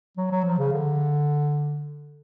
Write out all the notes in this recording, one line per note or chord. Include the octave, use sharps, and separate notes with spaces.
F#3
F#3
F3
C#3
D3